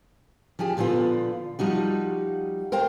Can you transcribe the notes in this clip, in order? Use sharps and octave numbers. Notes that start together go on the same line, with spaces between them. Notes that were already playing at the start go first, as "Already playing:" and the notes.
F3 C#4 G4 G#4
A#2 D3 F3 B3 F4
F3 G3 D#4 F#4
A#4 C5 F5 G5